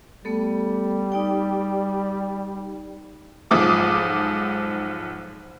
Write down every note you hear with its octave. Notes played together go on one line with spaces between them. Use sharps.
G3 A3 B3 A4
D#4 D5 G5
B1 G#2 F3 D6 D#6